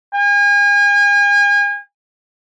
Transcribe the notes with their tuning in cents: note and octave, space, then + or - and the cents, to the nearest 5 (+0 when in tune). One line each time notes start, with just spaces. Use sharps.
G#5 -40